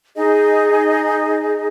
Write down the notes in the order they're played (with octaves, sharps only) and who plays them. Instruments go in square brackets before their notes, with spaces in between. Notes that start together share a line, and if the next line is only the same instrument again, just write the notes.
[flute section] D#4 G#4 D#5